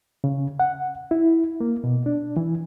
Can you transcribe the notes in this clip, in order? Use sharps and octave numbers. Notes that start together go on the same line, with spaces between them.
C#3
F#5
E4
A#3
B2
D4
E3